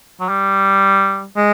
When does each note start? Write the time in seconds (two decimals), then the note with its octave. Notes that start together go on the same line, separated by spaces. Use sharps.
0.20 F#3
0.29 G3
1.37 G#3